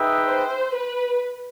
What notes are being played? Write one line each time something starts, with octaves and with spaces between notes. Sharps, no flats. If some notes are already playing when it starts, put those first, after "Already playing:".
Already playing: D#4 G#4 B4 E5 G5
C5
B4